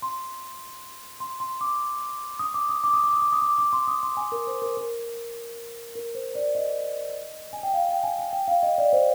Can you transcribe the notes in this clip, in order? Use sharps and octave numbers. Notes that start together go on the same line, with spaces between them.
C6
C6
C6
D6
D#6
D6
D#6
D6
D#6
D6
D#6
D6
D#6
D6
D6
C6
D#6
C6
G#5
A#4
C5
A#4
A#4
A#4
C5
D5
D#5
G#5
G5
F5
G5
G#5
G#5
G5
F5
D#5
D5
C5